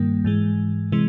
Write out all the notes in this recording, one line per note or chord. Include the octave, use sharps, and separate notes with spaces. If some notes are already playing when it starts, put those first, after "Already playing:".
Already playing: G2 D#3 G3 A#3
G#2 E3 G#3
C3 E3 G#3